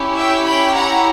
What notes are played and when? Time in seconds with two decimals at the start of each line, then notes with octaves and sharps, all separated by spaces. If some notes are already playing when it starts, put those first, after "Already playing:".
Already playing: C#4 E4 G4
0.16 E5 G5
0.45 G5 B5
0.74 F#5 A#5